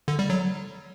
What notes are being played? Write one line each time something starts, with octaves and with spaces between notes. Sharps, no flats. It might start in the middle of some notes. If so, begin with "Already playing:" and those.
D3
G3
F#3